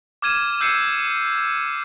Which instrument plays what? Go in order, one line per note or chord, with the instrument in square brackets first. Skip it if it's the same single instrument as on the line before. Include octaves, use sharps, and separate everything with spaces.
[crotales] D6 F6 G#6 D#7 E7
E6 G6 C7 C#7 D#7